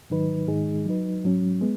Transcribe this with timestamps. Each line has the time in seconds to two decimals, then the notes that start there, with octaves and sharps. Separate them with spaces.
0.10 G#2 D#3 F#3 D#4 B4
0.48 G#2 D#3 G#3 D#4 G#4
0.86 F#3 D#4 B4
1.24 G#2 F#3 C#4
1.61 G#3 B3